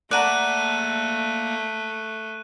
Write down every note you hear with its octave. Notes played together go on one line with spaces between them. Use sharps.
A3 A#3 D5 F#5 A5 A#5 F#6 D#7